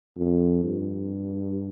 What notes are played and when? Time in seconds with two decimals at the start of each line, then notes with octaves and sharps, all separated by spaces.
0.18 F2
0.64 G2